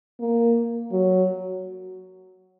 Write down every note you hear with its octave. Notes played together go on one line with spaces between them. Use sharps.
A#3
F#3